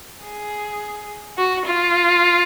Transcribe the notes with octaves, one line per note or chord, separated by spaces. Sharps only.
G#4
F#4
F4